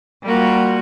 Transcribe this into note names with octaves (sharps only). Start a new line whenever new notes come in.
G3 A#3 F4 F#4